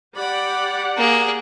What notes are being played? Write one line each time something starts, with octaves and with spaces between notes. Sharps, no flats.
G4 D5 F#5 B5
A#3 G#4